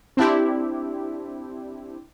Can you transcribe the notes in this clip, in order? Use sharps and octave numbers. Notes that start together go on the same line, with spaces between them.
C4 D4 E4 G4